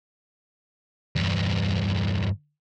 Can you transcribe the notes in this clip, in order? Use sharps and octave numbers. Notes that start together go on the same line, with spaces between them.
E2 G2